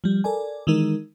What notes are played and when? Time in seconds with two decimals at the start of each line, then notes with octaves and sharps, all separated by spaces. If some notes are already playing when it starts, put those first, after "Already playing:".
0.04 F3 G3
0.24 A4 A#4 D5 G#5
0.67 D#3 E3 G#3 D#4 A#4